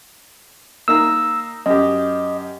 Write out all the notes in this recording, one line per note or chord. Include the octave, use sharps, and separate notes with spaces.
A#3 D#4 A#5 E6
F#2 G4 D#5